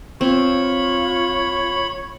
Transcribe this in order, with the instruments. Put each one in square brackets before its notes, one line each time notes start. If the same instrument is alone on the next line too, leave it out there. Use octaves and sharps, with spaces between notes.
[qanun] C4 [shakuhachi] F4 [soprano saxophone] C#5 [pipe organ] B5